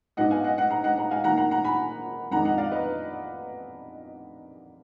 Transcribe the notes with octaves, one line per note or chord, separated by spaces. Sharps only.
G#2 F#3 B3 D4 D#5 F#5
F5 G#5
D#5 F#5
D#5 F#5
F#5 A#5
D#5 F#5
F#5 A#5
F5 G#5
D#3 F#3 A#3 F#5 A#5
F#5 A#5
F#5 A#5
G#5 B5
F2 D#3 G#3 D4 F#5 A#5
D#5 F#5
D5 F5
B4 D#5